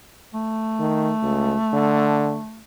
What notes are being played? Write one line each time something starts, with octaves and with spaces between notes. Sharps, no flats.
A3
D#3
C#2
D3